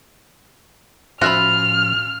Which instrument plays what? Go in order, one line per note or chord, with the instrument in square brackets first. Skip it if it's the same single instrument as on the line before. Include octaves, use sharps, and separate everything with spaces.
[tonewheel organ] A2 F3 C#4 [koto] F4 [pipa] F#4 E5 B5 [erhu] F6